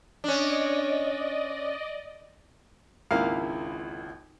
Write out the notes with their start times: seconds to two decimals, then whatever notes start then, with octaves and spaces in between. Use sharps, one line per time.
0.24 C#4 D4 D5 D#5
3.11 G#1 C#2 A#3 E4 F5